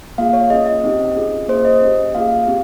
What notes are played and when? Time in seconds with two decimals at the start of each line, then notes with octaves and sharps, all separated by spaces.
0.18 A#3 F4 G#4 F5
0.33 C#5
0.50 A#3 C#4 F4 G#4 D#5
0.66 D#5
0.84 C4 D#4 G4
1.16 C#4 F4 G#4
1.48 A#3 F4 G#4 C5
1.65 D#5
1.82 C#4 G4
2.14 A#3 F4 G#4 F5
2.47 C4 G4